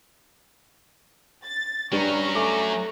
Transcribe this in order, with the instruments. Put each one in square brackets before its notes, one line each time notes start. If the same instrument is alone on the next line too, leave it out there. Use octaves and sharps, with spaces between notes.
[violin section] A6
[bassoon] G2 [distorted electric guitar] F#3 C#4 [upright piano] G3 D4 [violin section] A#5 C#6
[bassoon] A3 [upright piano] G#5 D6